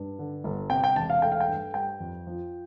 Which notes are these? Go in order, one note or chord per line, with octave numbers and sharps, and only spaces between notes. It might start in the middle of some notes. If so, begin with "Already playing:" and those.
Already playing: G2
D3
G1
C3 G5
G5
E1 A5
F5
A3 G5
F5
G5
G2
G3 G5
F2
F3